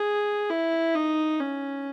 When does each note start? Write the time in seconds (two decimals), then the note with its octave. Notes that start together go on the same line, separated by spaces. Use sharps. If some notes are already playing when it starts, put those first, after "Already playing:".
Already playing: G#4
0.50 E4
0.95 D#4
1.39 C#4